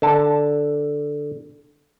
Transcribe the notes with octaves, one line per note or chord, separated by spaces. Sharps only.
D3 A5